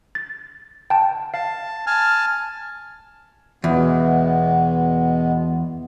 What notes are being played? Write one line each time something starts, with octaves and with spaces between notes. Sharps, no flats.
A6
G5 A5
F5 A5
G#5 A5 F6
E2 B2 G#3 B3